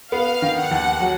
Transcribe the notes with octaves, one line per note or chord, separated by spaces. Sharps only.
B3 F5
D#3
F#5
D#2
F#3